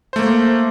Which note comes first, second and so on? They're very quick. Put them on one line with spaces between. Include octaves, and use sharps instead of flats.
C5 A3 A#3